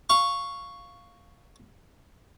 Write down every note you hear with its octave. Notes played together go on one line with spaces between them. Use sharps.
F5 C#6